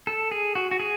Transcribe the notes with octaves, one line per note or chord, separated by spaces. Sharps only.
A4
G#4
F#4
F#4
G#4